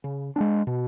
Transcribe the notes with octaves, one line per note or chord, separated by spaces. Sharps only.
C#3
G#3 B3 D4
B2